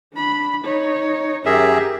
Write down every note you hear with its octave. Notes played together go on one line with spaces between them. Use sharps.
D4 B5
D#4 C#5
F#2 G4 G#4 A#4 E5